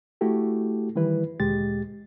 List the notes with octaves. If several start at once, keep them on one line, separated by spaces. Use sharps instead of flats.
A3 E4 F#4 G4 A4
D#3 E3 G3 E4 B4
D2 A#2 G#3 G4 A6